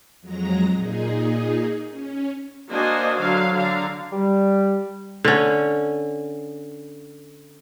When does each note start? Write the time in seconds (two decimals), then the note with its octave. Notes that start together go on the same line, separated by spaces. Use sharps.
0.21 F2 F#3 G#3 A#5 A#6
0.73 A#2 D#4 G#4
1.90 C#4
2.70 A#3 D4 F#4 C5 D#5 G#5
3.20 D3 F#3 F5
3.56 D3 F5 A#5
4.12 G3
5.24 D3 C#4